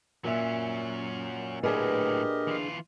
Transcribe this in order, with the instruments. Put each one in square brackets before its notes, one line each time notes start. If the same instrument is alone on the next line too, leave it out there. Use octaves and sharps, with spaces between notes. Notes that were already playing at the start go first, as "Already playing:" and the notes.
[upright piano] A#2 E5 [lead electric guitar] F#3 C#4
[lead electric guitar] A2 F#3 [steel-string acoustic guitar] D4 G#4 B4 [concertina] G4 A#4 D#5
[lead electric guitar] E3 F4